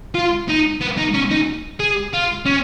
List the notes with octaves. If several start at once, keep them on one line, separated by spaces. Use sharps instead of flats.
F4
D#4
B3
D#4
C#4
D#4
G#4
F4
C#4